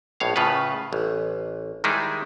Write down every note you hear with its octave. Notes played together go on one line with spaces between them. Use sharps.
A#1 A2 C#5 F5
A2 C#3 F4 B4
A1
D#3 G3 G#3 D#4 E4 G#4